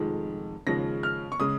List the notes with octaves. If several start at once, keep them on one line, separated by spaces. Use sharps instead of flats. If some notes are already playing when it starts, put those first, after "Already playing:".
Already playing: F1 F2 D#3 G#3
D#2 C#3 F3 G#3 A#6
F6
C#6
C#3 G#3 D#6